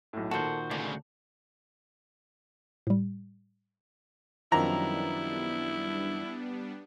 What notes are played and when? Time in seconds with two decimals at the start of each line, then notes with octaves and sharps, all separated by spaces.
0.13 B1 A2
0.31 A#2 D#3 F#4 A4 A#4 C5
0.71 D2 C#3 D4
2.87 A2 G3
4.52 F#2 D#3 F3 G3 B3 D4 E4 A#5